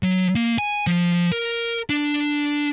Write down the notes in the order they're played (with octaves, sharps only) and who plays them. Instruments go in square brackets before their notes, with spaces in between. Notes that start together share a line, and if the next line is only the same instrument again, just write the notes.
[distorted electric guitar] F#3
A#3
G#5
F3
A#4
D4